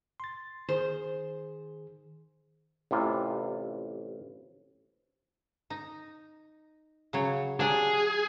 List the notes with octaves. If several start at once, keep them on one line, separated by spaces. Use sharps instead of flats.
C6 A6
D#3 G#4 C5
A1 C3 E3 F4
D#4
C#3 F#3 C#5
F#3 D4 G4 G#4